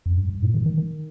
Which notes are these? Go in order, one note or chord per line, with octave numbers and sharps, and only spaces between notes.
F2
G2
G2
A#2
D#3
D#3
D#3